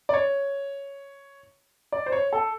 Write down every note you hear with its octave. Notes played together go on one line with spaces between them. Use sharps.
D5
C#5
D5
C5
C#5
A4